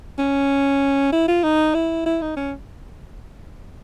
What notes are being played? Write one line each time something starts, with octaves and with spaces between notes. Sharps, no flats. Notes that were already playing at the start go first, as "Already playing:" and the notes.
C#4
E4
F4
D#4
E4
E4
D#4
C#4